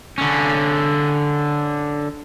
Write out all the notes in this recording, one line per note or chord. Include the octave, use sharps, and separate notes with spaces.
D3 C#4